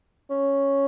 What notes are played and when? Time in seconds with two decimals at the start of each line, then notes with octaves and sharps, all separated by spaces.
0.30 C#4